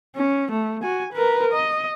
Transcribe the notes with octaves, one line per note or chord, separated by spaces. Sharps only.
C#4
A3
F#4 G#5
A#4 B4
D#5